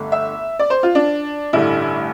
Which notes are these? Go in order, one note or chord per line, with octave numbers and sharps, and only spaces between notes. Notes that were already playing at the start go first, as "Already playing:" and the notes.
Already playing: G1 G2 D3 A3
E5
D5
C5
F4
D4
A1 G2 D3 G3 E4